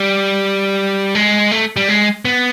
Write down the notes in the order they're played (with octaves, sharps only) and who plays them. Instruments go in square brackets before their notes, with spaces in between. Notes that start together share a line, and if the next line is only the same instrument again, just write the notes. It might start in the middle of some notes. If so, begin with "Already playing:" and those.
Already playing: [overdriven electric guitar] G3
G#3
A3
G3
G#3
B3